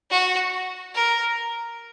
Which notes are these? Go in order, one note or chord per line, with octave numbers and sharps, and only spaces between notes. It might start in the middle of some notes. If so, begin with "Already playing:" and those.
F#4
A#4